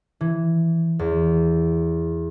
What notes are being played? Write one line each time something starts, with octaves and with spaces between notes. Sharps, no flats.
E3
E2